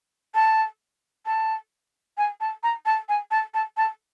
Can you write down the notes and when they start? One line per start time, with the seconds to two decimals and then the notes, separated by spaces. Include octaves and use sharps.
0.35 A5
1.26 A5
2.18 G#5
2.41 A5
2.63 A#5
2.86 A5
3.09 G#5
3.31 A5
3.54 A5
3.77 A5